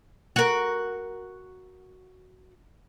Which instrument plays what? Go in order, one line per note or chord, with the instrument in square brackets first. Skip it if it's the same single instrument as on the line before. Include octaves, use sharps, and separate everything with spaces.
[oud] F#4 A#4